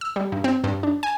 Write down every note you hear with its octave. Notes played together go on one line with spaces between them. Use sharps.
E6
G3
G2
C4
G2
D4
G#5